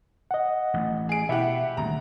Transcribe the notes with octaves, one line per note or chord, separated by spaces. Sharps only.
D#5 F#5
A1
G#4 D7
B2 E4 G4 E5 F#5
D#1 D2 A#5